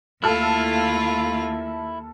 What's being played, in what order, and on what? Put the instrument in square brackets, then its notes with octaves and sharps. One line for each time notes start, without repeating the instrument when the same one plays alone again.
[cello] D#2 [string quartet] A3 F4 F5 [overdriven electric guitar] E4 [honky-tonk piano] A4 F6